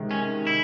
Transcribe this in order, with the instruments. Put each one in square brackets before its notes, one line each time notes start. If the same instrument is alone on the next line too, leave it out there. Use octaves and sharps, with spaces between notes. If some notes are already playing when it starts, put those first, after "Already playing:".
Already playing: [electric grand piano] C3 D#3 G#3
[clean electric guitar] C#4
E4